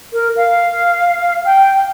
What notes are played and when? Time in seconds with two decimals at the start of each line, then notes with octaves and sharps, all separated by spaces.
0.13 A#4
0.37 F5
1.45 G5